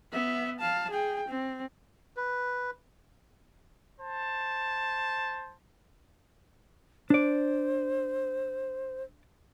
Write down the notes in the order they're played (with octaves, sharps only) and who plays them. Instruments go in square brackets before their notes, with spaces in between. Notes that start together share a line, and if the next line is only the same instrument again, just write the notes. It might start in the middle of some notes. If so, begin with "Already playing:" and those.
[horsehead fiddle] B3 E5
F5 A5
G#4 G5
C4
[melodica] B4
[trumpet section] C5 A5
[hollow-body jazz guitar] D4 D5 [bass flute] C5